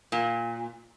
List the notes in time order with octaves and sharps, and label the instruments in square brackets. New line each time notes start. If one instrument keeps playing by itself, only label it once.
[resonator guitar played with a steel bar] A#2